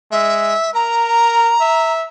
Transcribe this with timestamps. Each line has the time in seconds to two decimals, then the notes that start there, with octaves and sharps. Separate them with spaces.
0.12 G#3 E5
0.74 A#4 A#5
1.61 E5